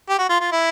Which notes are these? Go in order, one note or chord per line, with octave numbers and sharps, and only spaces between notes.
G4
F#4
F4
F4
E4